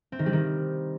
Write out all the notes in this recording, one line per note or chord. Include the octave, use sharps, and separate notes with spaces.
C4
D#3
G3
D#3